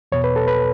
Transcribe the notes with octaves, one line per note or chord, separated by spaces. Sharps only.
E2 B2 C#5
B4
A4
B4